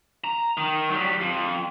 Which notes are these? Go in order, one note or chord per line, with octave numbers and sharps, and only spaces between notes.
A#5
D#3
F#3 G3
F2